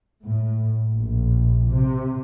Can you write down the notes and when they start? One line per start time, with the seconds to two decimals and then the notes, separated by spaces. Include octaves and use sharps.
0.22 A2
0.91 A#1
1.69 C3